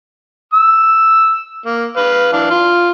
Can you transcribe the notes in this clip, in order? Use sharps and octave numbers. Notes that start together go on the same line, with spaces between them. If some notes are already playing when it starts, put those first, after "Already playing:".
E6
A#3
B4 F5
E3 D4 F5
F4